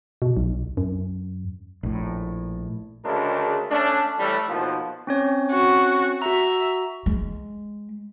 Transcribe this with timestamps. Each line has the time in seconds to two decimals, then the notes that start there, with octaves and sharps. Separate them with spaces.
0.22 B2
0.37 B1
0.77 F#2
1.83 A#1 A2
3.05 D2 C#3 G#3 D4 A#4
3.71 A3 C#4 D4
4.18 A2 E3 G3 A3
4.49 D#2 B2 D#3 F3
5.07 C4 C#4 C#5
5.52 F#4
6.22 F#4 E5 A#5
7.06 G#3